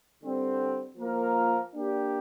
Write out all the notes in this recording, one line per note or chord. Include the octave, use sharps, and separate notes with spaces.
D3 G3 C4
F3 A#3 F4 A#4 F5
A#3 D4 G4